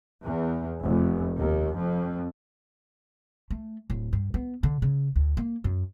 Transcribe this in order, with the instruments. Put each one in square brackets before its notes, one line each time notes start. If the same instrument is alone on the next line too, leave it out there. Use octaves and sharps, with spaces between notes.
[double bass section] E2
F1
D#2
F2
[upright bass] A3
D1
G2
B3
D3
C#3
D2
A#3
F#2